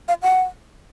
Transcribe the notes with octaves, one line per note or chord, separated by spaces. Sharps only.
F5
F#5